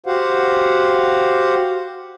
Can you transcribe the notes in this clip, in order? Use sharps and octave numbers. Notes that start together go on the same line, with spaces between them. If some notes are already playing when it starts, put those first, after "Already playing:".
F#4 G4 C5 F5 F#5